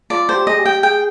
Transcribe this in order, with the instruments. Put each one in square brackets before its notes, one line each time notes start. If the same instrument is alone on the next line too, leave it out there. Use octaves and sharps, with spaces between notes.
[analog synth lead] F4 [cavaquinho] D5
[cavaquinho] C5
[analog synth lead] G4
[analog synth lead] G#4 [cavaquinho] D#5
[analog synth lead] G4
[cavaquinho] G5
[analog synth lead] G#4 [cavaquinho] G5